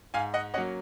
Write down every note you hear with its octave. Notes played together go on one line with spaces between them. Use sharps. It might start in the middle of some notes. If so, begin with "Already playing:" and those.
G#2 F5 G#5
D#5 F#5
F#3 A#3 C#4 D#5 F#5